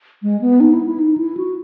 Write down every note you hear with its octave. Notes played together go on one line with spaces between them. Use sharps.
G#3
B3
D#4
E4
E4
D#4
E4
F#4